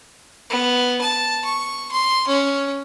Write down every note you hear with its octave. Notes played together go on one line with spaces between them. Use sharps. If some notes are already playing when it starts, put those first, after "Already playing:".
B3
A5
C#6
C6
C#4